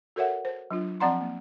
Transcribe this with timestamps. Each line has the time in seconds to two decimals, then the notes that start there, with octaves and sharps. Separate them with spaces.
0.16 F#4 A4 A#4 C#5 E5 F#5
0.45 C5
0.71 F#3 D4 F4
1.00 F3 C4 D5 F#5 A#5 C6
1.21 A#3